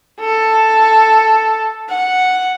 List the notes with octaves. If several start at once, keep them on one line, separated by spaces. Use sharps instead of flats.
A4
F#5